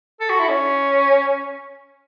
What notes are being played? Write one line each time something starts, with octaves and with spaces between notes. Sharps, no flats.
A4
F#4
E4
C#4